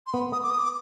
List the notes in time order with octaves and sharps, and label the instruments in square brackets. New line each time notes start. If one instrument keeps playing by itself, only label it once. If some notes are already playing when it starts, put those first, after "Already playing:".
[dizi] C6
[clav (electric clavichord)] B3 [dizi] B5
[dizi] D#6
D6
D#6
D6